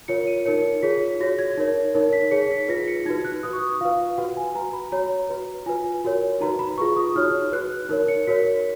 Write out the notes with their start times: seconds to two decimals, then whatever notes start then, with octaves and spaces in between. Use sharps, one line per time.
0.08 F4 A#4 C#5 C#7
0.27 D#7
0.45 D#4 A#4 C#5 C#7
0.83 F4 G#4 C#5 B6
1.21 F#4 C#5 A#6
1.39 G#6
1.57 D#4 A#4 C#5
1.94 D#4 A#4 C#5
2.13 B6
2.31 D#4 G#4 C#5 C#7
2.51 B6
2.68 F4 B4 A#6
2.88 C#7
3.06 D#4 F#4 B4 G#6
3.25 F#6
3.43 F#4 B4 D#6
3.53 C#6
3.81 F4 B4 F5
4.18 F#4 B4 F#5
4.37 G#5
4.55 F#4 B4 A#5
4.73 B5
4.92 F#4 C#5 A#5
5.29 F#4 B4
5.66 F4 B4 G#5
6.04 F#4 A#4 C#5
6.40 D#4 F#4 B4 A#5
6.59 B5
6.78 F4 G#4 B4 C#6
6.96 D#6
7.15 D#4 F#4 C#5 F6
7.52 F#4 B4 F#6
7.89 D#4 A#4 C#5
8.08 C#7
8.27 F#4 A#4 C#5 B6